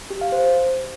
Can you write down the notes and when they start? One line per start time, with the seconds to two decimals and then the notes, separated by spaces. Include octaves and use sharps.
0.10 G4
0.21 F5
0.32 C5